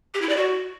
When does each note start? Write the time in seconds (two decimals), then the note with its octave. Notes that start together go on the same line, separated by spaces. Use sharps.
0.14 G4
0.22 E4
0.29 D5
0.37 F#4